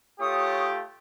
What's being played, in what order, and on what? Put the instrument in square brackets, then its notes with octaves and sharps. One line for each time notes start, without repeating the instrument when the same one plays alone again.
[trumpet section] A3 F4 G4 [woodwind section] C#5 C#6 D#6